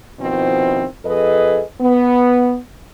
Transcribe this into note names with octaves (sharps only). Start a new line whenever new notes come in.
B2 D#3 F3 C4 E4 C5
F2 G#4 A4 B4 D#5
B3